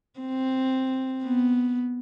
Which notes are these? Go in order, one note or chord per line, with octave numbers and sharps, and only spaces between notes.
C4
B3